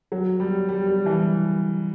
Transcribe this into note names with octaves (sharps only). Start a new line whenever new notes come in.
F#3
G3
G3
G3
E3